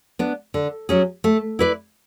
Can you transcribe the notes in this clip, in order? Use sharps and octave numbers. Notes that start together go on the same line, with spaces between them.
B3 D4
D3
F#3 C#4 G#4
A3
E4 B4 D5